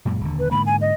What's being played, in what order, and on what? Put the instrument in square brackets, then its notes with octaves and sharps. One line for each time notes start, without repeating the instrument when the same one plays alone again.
[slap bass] F#2 A#2 G#3
D#1 D3
[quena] B4
[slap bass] G#2 D3 A#3 [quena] B5
[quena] G#5
D#5